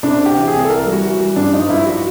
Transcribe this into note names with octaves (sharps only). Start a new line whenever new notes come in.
C3 D4
C3
G4
E3
G#4
C2
A4
E3 A#4
G3
F#4
E3
G3
G2 D4
F3 D#4
G2 E4
F#4